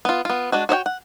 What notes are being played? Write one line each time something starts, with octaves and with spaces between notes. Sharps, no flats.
B3 F4
B3 F4
G#3 D4 F#4
F#4 C#5 D#5 G5
F#5